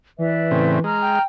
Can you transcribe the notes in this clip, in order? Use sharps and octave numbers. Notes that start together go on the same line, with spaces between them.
E3 B4 D5 E5
A2 C#3 C4
G#3 A#5 F6
G5